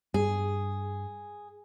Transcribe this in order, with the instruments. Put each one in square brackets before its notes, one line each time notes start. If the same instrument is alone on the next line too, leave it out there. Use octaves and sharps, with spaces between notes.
[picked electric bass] G2 [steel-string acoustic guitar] G#4